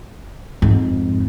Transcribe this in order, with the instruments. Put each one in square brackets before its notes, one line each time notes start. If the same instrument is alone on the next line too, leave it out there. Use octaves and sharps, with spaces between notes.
[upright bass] F2 G#2